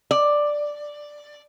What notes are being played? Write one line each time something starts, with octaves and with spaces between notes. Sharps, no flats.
D5